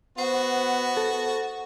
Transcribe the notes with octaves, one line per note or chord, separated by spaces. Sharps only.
B3 F#4 C5
A4